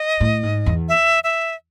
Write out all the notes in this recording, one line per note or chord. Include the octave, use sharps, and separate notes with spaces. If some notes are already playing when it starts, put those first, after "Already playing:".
Already playing: D#5
A2
G#2
E2
E5
E5